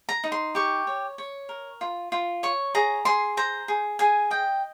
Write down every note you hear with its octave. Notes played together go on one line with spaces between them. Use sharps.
A#5
D#4
C6
G4 C#6
C#5
C#5
A#4
F4
F4
C#5 C#6
G#4 A#5
G#4 C6
C5 A#5
G#4
G#4 G#5
D#5 G5